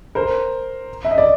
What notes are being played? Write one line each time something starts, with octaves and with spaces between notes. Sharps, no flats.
A#4 C5
E5
D#5
D5